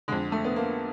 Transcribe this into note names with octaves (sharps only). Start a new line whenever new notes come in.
F2 D3 G#3
A3
B3
A#3